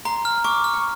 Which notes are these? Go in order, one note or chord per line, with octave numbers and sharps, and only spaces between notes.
A#5 C6
F6
C#6 D6
F6
C#6